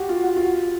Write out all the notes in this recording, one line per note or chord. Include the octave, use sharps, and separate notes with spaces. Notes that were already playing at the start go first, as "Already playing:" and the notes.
Already playing: F#4 G4
F4
F#4
F4